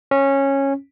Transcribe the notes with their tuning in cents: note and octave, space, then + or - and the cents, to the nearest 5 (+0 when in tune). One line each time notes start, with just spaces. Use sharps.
C#4 -15